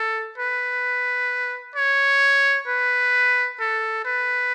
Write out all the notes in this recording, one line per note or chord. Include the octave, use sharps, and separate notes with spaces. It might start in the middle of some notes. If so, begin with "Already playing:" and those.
Already playing: A4
B4
C#5
B4
A4
B4